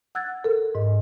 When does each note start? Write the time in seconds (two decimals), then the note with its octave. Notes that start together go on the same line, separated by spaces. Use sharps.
0.15 F#5 E6 F#6 G#6 A6
0.44 A4 A#4
0.75 G#2 D#5